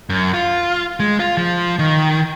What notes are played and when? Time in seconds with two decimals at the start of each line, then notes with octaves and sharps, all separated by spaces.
0.10 F#2
0.34 F4
1.00 G#3
1.20 F4
1.37 F3
1.79 D#3